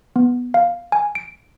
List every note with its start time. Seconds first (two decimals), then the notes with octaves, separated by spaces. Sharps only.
0.16 B3
0.54 F5
0.92 G#5
1.15 D7